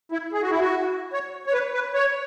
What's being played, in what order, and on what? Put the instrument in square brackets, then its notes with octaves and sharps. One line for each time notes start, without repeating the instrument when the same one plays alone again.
[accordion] E4
G#4
F#4
E4
F#4
C#5
C#5
B4
B4
C#5